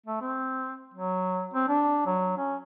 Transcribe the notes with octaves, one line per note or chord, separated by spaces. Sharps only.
A3
C4
F#3
C4
D4
F#3
C#4